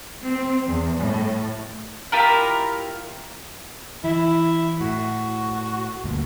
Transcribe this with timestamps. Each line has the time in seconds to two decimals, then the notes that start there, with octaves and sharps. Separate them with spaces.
0.24 C4
0.65 E2
0.99 A2
2.12 E4 F4 G4 A#4
4.04 E3 E4
4.81 A2 F#4
6.04 D2 G2 A#2